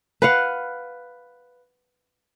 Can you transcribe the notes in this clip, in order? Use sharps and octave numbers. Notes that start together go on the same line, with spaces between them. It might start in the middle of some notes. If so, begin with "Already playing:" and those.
B4 F5 F#5